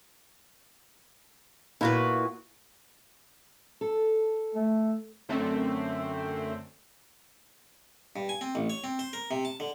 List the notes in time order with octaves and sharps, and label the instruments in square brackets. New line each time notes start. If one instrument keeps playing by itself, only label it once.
[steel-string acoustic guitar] A#2 [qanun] E4 F#4 B4
[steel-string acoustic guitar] A4
[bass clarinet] A3
[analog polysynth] F#2 D3 A3 C4
[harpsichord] G2
G#5
C4
A1
C#5
C4
C5
A#4
C3
A5
D3